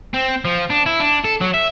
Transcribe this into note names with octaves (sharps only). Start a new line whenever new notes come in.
C4
F3
D4
E4
D4
A4
F#3
E5